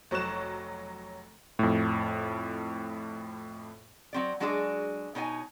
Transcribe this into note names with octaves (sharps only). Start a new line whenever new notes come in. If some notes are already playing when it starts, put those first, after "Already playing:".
F1 F#3 C#6 F#6 E7
F2 A2
F#3 C4 D5
F#3 G#3 D4 F#4 G#4 D5
B2 D#4 C#5 D5 G#5